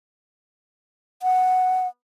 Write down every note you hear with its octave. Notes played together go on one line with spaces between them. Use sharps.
F#5